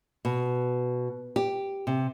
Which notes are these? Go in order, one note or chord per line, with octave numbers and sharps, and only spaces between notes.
B2
G4
C3